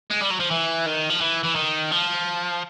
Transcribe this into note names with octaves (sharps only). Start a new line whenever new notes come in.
G#3
G3
F#3
F3
E3
D#3
F3
E3
E3
D#3
F3